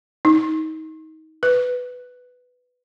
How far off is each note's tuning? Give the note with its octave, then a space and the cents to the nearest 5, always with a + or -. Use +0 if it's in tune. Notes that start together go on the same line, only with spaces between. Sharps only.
D#4 +25
B4 +5